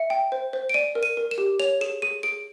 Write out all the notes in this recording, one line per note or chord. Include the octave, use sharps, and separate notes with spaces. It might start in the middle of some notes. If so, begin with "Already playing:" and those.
Already playing: E5 C#7
G5
C5
C5
D7
D5 D#7
A#4
D#7
A#4
E7
G4
C#5 F7
G#4 E7
G#4 D#7
G#4 D7